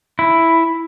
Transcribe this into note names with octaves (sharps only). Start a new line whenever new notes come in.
E4